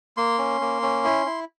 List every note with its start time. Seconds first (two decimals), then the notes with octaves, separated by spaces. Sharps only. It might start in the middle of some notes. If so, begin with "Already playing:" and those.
0.17 A#3 C6
0.38 C#4
0.61 A#3
0.82 C#4
1.05 E4
1.26 E4